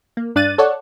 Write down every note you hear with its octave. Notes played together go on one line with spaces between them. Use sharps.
A#3
G2 D4 D5 F#6 A6 D#7
A4 C#5 D5 F#5